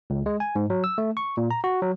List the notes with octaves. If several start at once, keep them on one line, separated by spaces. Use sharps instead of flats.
C#2
G#3
G#5
G#2
F#3
E6
A3
C#6
A#2
A#5
F#4
F#3